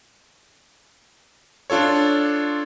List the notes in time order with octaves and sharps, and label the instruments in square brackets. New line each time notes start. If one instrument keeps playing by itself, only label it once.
[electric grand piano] D4 F4 A4 C#5